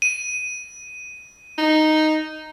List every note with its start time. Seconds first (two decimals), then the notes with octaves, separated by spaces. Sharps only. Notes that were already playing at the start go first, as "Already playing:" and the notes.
0.02 D#7
1.58 D#4